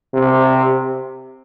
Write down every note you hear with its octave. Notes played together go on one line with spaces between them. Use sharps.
C3